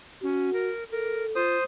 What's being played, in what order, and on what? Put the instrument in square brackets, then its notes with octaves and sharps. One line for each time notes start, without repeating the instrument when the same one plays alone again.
[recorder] C#4 [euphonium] F#4
[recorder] A#4
[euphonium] A4 [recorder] A#4
[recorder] F4 [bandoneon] C5 D#6